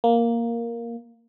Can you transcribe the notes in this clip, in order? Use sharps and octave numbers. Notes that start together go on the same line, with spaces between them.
A#3